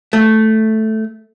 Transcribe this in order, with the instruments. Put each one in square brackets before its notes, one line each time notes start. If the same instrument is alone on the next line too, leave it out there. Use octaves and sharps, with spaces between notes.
[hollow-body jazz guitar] A3